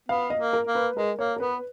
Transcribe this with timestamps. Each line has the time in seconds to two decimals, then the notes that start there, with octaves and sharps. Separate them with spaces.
0.09 B3 F5
0.30 D#5
0.38 A#3
0.53 A#4
0.67 A#3
0.75 B4
0.96 G#3 A#4
1.19 A#3 C#5
1.36 A#4
1.40 B3 B4